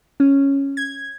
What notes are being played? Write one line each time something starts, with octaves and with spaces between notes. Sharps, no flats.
C#4
G#6